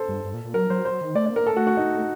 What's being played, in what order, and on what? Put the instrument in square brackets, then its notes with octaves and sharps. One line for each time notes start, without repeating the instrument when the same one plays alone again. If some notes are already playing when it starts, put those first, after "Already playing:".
Already playing: [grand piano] A4 C5
[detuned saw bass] G2
G2
A#2
A#2
[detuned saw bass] F#3 [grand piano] A#4
[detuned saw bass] F#3 [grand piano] C5
[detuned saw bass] F#3 [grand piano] C5
[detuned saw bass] D#3
[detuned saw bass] A3 [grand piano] D5
[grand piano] D5
[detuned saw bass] A#3 [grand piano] A#4
[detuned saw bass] A3 [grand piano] A4
[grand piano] F#4
F#4
D#4